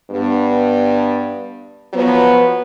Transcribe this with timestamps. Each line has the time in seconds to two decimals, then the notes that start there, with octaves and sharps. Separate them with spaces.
0.11 G2 B3
1.93 F3 F#3 B3